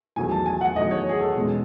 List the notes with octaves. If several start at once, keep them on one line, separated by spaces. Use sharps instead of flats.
E2 D#3 F#3 A3 G#5
A5
G#5
F#5
E2 D#3 F#3 A3 D#5
C#5
G#4
A4
E2 B2 G#3 C#4